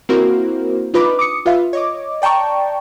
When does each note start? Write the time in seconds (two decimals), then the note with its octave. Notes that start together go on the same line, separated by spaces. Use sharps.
0.09 A#3 C4 E4 F#4 A#4 C5
0.94 D4 D#4 F4 B4 B5 D6
1.19 D6 D#6 C#7
1.46 F4 B4 E5 F5
1.73 C#5 D#5 D6
2.22 D5 G5 A5 A#5 C#6